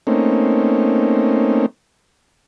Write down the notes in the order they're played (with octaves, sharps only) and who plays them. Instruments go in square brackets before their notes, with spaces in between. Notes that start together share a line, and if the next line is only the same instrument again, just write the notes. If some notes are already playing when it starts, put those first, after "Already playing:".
[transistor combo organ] A3 A#3 C4 C#4 D#4